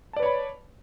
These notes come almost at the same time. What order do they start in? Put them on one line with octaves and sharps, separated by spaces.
A5 D5 B4 C#5 B5